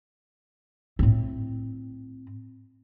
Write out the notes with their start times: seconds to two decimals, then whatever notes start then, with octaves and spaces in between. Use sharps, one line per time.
0.99 A2 C4